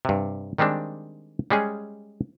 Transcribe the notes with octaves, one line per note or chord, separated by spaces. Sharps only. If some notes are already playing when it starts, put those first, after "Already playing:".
G2 C3
D#3 G3 G#3 C4 D4
G3 G#3 C#4 G#4